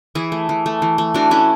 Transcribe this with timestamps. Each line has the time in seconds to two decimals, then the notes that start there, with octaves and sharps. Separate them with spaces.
0.15 E3 E4 G#4
0.32 A3
0.49 E3
0.66 A3
0.82 E3
0.98 A3
1.14 E3 D4 F#4
1.31 A3 C#4 E4